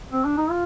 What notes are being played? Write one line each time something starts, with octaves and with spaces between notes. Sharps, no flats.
C4
D4
D#4
F4